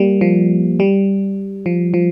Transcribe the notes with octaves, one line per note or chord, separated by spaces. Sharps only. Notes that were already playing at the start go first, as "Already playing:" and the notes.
Already playing: G3 A#3
F3
G3
F3
F3